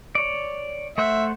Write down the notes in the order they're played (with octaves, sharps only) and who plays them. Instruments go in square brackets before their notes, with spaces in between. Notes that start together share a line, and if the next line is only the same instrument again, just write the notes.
[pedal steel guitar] C#5 D5
[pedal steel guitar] A3 C5 F#5 [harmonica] E5